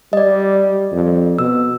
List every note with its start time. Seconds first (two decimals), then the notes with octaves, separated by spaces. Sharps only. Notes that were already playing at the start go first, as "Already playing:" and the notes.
0.13 G3 D5 D#5
0.92 F2
1.39 B2 E6